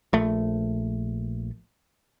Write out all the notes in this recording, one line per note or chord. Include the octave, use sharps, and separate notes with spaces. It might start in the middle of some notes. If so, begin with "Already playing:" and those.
A#1 A3